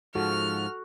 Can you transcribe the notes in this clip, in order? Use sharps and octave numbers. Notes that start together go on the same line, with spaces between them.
G#2 F3 F#4 A4 F6